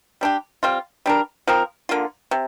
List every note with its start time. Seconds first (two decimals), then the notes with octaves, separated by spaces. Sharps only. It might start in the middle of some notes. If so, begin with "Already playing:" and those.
0.21 G3 D4 G4
0.63 G3 C4 F4
1.06 G3 D4 A#4
1.47 F3 C4 A#4
1.89 D3 A#3 F4
2.31 C3